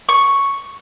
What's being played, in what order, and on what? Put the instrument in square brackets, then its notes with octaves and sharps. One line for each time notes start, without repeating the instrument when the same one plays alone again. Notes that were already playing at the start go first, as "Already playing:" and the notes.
[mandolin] C#6